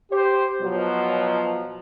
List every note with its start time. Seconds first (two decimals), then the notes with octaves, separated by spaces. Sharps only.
0.12 G4 C5
0.61 B2 F3 F#3